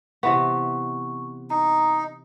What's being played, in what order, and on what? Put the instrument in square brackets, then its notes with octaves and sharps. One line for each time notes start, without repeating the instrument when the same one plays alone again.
[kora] C3 E3 B3 [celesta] C#6
[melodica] D#4 [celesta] A#5